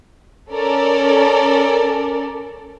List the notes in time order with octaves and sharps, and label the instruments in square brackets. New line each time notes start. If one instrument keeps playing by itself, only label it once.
[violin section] C#4 A4 A#4 D5